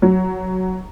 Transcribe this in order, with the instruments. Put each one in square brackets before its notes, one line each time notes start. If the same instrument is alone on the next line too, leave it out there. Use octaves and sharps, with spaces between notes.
[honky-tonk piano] F#3